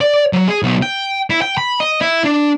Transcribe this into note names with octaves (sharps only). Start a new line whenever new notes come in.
D5
F#3
G#4
B1
G5
E4
G5
B5
D#5
E4
D4